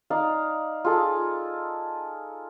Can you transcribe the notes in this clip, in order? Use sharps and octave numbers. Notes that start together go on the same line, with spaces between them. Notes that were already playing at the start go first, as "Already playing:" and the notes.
D#4 D5 F5
F4 G#4 A4